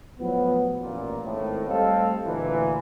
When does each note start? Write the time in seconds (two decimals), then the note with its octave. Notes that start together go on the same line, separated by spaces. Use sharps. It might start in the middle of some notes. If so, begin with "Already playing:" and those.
0.19 A2 F3 F#3 B3
0.82 A1 A#2
1.25 G#1 A2
1.67 G3 A3 C4 A4 D#5 F5
2.25 D2 A#2 E3